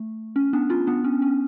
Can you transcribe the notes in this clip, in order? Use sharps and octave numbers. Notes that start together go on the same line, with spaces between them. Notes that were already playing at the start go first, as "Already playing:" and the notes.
Already playing: A3
C#4
B3 D4
C#4 F4
B3 D4
C#4
C#4